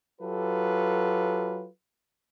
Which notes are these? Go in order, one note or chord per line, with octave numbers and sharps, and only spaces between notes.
F#3 F4 G4 A4 B4